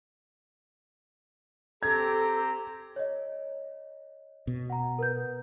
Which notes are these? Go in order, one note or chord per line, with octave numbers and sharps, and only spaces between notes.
C4 G4 A4 A#5 G#6
C#5 D#5
B2
F#5 A#5
A#4 B4 G6